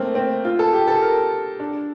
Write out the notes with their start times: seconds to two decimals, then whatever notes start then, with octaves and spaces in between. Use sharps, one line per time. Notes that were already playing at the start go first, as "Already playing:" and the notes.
Already playing: A3 A#3 C4
0.15 C4
0.45 F4
0.59 A4
0.73 G4
0.88 A4
1.02 A#4
1.60 D4